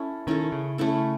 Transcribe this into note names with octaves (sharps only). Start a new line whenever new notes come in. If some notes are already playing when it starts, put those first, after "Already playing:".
Already playing: C#4 E4 A4
D#3 C#4 E4 A4
C#3
A3 C#4 E4 A4